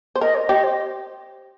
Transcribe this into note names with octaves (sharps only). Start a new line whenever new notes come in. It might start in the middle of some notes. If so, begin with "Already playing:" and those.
C5
A#4 D#5
C5
G4 D#5
C5